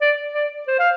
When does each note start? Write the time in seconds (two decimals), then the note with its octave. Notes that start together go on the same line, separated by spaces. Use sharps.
0.01 D5
0.35 D5
0.68 C5
0.79 F5